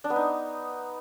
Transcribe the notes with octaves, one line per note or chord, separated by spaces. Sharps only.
D4
B3
D#4